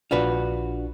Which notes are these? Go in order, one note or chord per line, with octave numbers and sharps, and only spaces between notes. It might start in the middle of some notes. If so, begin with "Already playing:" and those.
A#1 D4 F4 F#4 B4